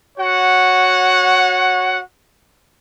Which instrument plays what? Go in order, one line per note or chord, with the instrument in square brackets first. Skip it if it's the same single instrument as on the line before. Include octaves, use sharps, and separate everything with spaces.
[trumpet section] F#4 C#5 F#5